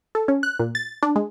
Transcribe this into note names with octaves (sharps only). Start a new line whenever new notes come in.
A4
C#4
F#6
A#2
A6
D4
G#3